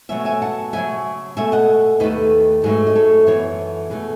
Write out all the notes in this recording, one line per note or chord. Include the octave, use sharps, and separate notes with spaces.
B2 F#3 A3 E5 G#5
E5 G#5
F#5 A5
E2 C#3 F#3 E5 G#5
B2 A3 E5 G#5
D#5 F#5
D#2 D#3 A3 B4 D#5
G#2 F#3 A3 G#4 B4
D#5
A4 C#5
F#2 E3 B3 A4 C#5
B2 A3 G#4 B4